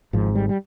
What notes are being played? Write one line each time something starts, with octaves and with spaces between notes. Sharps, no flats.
G#1 G#2 F3
G3
G3